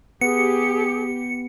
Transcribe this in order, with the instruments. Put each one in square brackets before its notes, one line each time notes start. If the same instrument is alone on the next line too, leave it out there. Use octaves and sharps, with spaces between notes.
[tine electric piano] B3 [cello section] G4 [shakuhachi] G#4 [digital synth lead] C#7